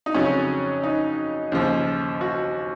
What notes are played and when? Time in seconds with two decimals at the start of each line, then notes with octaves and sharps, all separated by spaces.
0.06 D#4
0.14 F2 C#3 F#3 C#4
0.83 D#4
1.52 D#2 C#3 F3
2.21 F#4